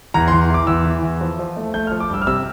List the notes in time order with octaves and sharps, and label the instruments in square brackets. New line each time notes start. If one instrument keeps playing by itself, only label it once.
[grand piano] E2 A#5
E2 C6
E3 D6
E2 E6
E3
E2
F3
F3
A3
A3 G6
F6
F3
D6
G2 E6
F6
C3 E6